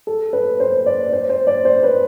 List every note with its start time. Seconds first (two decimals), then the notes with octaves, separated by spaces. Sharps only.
0.07 A4
0.33 B4
0.60 C5
0.86 D5
1.13 C5
1.29 C5
1.47 D5
1.65 C5
1.83 B4